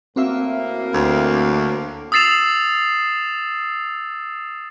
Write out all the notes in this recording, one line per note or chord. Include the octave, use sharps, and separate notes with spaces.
A2 A#3 C4 F#4 E5
D2
D#6 E6 A6 C7 E7 F7